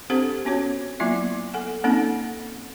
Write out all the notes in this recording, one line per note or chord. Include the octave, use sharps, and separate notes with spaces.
C4 D4 G4 A4 C5 F#5
B3 C#4 F#4 C#5
F#3 A#3 B3 E4 F4 E5
A4 F#5 G#5
A#3 C4 C#4 D#4 A4 F#5